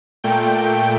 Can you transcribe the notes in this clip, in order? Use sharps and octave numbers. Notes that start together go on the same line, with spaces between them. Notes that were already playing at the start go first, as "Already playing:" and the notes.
A#2 A3 G5